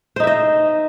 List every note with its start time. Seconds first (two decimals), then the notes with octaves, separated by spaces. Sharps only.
0.16 C5
0.20 D#4
0.24 E5
0.27 D#5